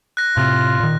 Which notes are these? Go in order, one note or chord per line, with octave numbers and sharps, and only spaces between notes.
F#6 A#6
A2 C3 F4
A#2 D#3